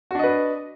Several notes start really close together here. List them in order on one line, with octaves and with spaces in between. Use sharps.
F#4 D4 D#5 B4